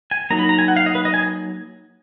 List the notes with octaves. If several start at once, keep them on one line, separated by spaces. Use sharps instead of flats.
G#5
F#3 A#3 D#4 A#5
B5
A#5
G#5
F#5
F5
D#5
B4
D#5
G#5